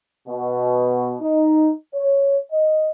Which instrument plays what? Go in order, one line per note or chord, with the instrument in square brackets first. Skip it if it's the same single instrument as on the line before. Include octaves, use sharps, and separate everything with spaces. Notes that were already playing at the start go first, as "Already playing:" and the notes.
[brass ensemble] B2
D#4
C#5
D#5